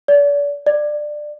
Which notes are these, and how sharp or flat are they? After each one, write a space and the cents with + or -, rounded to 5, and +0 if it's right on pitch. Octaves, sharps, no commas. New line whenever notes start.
D5 -40
D5 +20